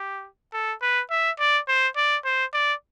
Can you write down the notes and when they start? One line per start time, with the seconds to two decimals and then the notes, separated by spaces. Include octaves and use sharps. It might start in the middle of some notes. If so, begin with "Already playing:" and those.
Already playing: G4
0.53 A4
0.81 B4
1.10 E5
1.39 D5
1.68 C5
1.96 D5
2.25 C5
2.53 D5